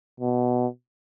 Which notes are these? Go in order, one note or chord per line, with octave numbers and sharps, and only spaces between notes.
B2